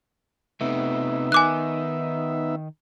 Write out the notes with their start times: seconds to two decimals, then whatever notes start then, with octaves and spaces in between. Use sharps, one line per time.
0.61 C3 A3 B3 D#4 E5
1.32 D#3 G#5 D6 F#6